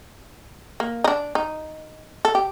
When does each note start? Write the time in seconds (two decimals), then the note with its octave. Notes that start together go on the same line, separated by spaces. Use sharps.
0.80 A#3
1.04 D#4
1.08 D4
1.35 D#4
2.25 A4
2.35 G4